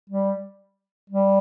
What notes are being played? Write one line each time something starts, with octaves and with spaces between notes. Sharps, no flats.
G3
G3